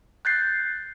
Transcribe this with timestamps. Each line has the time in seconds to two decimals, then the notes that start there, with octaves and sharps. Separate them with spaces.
0.25 F#6 G6 A6 C7